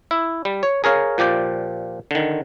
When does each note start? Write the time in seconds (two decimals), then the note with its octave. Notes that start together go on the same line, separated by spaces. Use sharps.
0.11 E4
0.45 G3
0.63 C#5
0.84 G#4 A#4 C#5 F5
1.18 A#2 F3 G4 D5 G5
2.11 D3 D#3